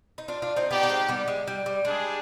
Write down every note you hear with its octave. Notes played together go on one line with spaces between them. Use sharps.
D#4
D4 F4
D4 F4
C4 D#4
B3 D4 D#4 G4 D5 G5
B3
G#3 C4
G3 B3
G#3
G3
G3
G3 G#3 D4 G#4